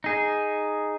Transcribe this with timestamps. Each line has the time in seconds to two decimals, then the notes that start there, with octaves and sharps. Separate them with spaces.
0.04 D#4 G#4